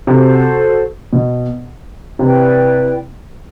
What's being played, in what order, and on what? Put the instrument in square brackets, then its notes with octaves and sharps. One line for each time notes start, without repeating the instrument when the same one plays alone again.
[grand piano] C3 [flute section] F#4 A4 C5
[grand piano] B2
[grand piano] C3 [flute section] E4 B4 D5 G5